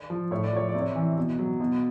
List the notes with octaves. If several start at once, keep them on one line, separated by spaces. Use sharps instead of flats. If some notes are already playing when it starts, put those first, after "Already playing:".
Already playing: D5
F3
A2 C#5
D5
F3 C#5
D5
C3
C#5
E3
B2
F#3
B2